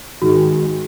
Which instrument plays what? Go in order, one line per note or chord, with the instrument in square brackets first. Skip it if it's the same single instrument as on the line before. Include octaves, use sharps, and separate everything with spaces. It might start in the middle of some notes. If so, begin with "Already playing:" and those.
[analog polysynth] G#2 D#3 G#3 [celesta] F#4